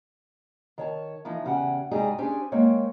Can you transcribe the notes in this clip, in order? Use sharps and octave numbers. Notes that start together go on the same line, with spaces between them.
D#3 C#5 A5
E3 F3 D#4
E2 C#3 G4 F#5 G#5
G#2 C3 G3 D#4 G#4
C#4 D4 G4 G#4 C5 G#5
G#3 A#3 C4 C#5